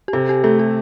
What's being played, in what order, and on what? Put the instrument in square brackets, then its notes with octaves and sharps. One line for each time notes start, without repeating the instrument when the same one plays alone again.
[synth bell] G4
[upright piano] C3 [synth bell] A4
[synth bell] G4
[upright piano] A3 [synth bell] A4
[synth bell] G4